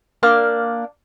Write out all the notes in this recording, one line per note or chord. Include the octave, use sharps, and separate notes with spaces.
A#3 D4 D6 F6